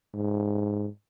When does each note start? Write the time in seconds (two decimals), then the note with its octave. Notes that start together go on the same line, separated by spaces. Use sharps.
0.15 G#2